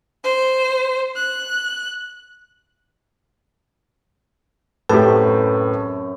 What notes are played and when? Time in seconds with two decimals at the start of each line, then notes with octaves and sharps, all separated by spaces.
0.24 C5
1.15 F#6
4.89 F#2 A2 C3 G4 B4 A5 B5